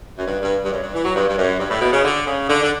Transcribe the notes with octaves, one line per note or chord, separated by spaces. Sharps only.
F#2
G2
G2
G2
F#2
G2
E3
F#3
G2
G2
F#2
G2
A2
B2
C#3
D3
C#3
D3
D3